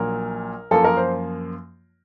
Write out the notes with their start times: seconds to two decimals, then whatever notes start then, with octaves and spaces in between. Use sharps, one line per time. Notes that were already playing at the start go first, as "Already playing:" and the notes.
Already playing: A#1 A#2 F#3 A#4
0.71 F#2 F3 A#3 F4 A4
0.84 A#4
0.97 C5